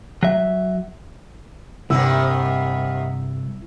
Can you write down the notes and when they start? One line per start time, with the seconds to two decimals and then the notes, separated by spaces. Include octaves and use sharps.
0.23 F#3 E5
1.90 C2 G2 C3 D#3 B3 E4 E6